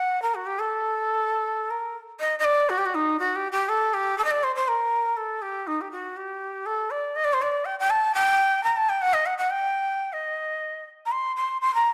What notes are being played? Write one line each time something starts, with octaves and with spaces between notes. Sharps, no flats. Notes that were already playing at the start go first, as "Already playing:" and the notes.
Already playing: F#5
A#4
F#4
G4
A4
A#4
D#5
D#5
D5
F#4
G4
F#4
D#4
F#4
G4
G4
A4
G4
A4
D#5
D5
C5
C5
A#4
A4
G4
D#4
G4
F#4
G4
A4
D5
D#5
D5
C5
D5
G5
G5
A5
G5
A#5
A5
G5
F#5
D#5
F#5
F#5
G5
D#5
A#5
C6
C6
C6
A#5